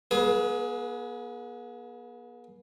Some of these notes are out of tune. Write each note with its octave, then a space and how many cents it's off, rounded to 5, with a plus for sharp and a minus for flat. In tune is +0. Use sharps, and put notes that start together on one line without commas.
B3 -45 G#4 +25 B4 -10